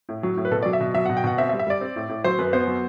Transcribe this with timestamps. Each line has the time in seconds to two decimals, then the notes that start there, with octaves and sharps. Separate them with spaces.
0.09 A2
0.23 F#3
0.37 A2
0.45 B4
0.51 B2 A4
0.63 F#3 D5
0.73 E5
0.80 B2
0.94 F#3 E5
1.06 B2 F#5
1.17 G5
1.24 B2 F#5
1.38 C4 E5
1.49 E5
1.53 G3
1.59 E5
1.67 G3 D5
1.81 C4
1.96 A2
2.09 A2
2.24 F#3 C5
2.39 F#2 B4
2.53 B3 C5
2.67 F#3